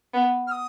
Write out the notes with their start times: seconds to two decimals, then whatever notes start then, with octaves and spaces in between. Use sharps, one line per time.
0.13 B3
0.47 F6
0.51 D#6